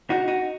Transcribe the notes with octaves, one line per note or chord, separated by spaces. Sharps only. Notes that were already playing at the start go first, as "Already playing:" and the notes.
D#4 F#4
D#4 F#4